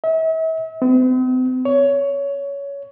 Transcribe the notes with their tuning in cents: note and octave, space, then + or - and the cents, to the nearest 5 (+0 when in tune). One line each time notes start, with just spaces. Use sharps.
E5 -40
C4 -45
C#5 +15